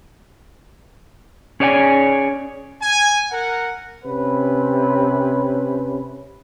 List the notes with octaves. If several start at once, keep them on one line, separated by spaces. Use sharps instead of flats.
C#4 G#4 C#5 D5 F5 G#5
G#5
A#4 F#5
C3 C#4 B4